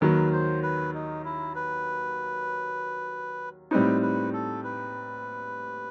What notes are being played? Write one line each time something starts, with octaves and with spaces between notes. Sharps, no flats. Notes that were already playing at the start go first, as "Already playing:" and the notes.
D#2 D#3 F#3 B4
C5
B4
D#4
E4
B4
A2 G3 C4 D#4 B4
B4
A4
B4